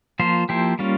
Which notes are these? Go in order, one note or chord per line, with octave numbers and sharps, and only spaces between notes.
F3 A#3 F4 C5
F3 A#3 E4 G4 C5
G3 A#3 C#4 F4